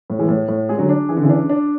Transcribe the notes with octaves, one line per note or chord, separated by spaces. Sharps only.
A2
E3 G#3
A2
A2
G#3 G#4
D3 F#3
D4
E3 G#4
D3
C#3 E3
D4
D4